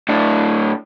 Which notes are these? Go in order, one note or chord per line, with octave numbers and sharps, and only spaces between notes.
A2 D4